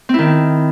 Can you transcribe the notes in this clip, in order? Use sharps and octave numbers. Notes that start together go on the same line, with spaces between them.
D#3 C4 E4